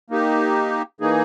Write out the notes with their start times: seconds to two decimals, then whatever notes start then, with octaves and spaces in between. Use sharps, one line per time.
0.10 A#3 D#4 G4
1.01 E3 A#3 D#4 G#4